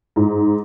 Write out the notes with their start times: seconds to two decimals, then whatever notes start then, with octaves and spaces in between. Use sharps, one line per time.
0.16 G#2